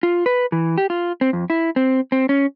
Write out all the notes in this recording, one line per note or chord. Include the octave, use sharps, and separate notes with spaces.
F4
B4
E3
G4
F4
C4
F2
E4
C4
C4
C#4